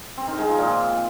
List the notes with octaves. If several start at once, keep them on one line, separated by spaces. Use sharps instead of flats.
C4
D#3
G#3
F3
A#2